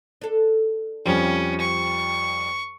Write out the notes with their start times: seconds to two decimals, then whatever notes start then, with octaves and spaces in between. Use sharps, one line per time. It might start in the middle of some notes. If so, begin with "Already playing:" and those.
0.21 D4 A4
1.05 F2 F3 G3 C#4
1.60 C#6